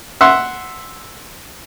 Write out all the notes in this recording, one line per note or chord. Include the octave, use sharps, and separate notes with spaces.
E5 F#5 C6